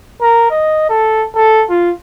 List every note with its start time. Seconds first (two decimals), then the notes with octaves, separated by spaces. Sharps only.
0.21 A#4
0.50 D#5
0.89 A4
1.35 A4
1.69 F4